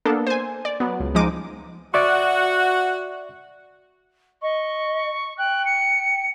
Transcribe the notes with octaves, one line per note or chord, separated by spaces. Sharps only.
A#3 B3 D4 A4
C5 G#5
D5
F#3 B3
C#2
F3 G#3 D#4 D6 D#7
F#4 D5 E5 C#6
D#5 C#6
G5 F#6
C#7